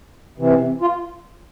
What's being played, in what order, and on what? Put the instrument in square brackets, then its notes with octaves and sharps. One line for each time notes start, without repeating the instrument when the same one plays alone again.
[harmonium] C3 E3
F4